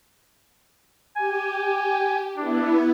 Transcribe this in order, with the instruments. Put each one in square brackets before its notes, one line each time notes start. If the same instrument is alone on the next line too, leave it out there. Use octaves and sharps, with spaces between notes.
[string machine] G4 [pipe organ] G#5
[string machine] B3 E4 [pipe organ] D4